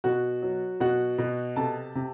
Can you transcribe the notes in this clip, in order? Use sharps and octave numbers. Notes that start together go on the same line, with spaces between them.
B2 F#4 F#5
F#3
B2 F#4 F#5
B2
C3 A4 A5
C3